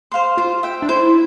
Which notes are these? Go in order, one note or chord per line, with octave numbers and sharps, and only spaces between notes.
C5 F5 C6
F4 C5
E5 G5
D4
E4 C5